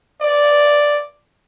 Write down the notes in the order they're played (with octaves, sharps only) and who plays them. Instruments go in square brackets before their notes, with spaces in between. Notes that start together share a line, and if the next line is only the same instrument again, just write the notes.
[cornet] D5